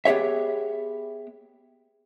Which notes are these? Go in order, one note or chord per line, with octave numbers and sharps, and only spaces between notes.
B3 G4 G#4 C#5 E5